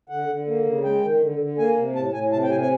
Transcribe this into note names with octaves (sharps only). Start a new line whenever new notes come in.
D3 F#5
D3
A#3
C#3
G#3 G5
D#3
D3
D3
A#3 G#5
C3
A2 A5
A2 G#5
C3 A5
G5
C3 G#5
G#5